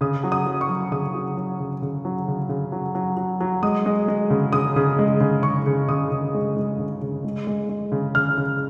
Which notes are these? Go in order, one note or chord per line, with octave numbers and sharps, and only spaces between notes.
C#3 D#6
F#3
D#6
F#3
C#6
F#3
C#3 D#6
F#3
F#3
C#3
C#3
F#3
C#3
C#3
F#3
F#3
F#3
F#3
G#3 D#6
G#3
G#3
C#3
C#3 D#6
C#3
G#3
C#3
C#3 C#6
C#3
C#3 D#6
C#3
G#3
G#3
C#3
C#3
G#3
G#3
G#3
C#3
C#3 F6
C#3